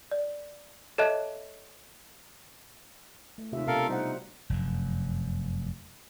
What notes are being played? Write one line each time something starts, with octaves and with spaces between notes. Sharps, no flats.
D5
A4 C#5 D#5 E5 A5 F#6
A3
D#2 C3 F4 E5
B2 D4 F4 A4 A#4 F5
G3 D#4 C5 F#5
F1 F#2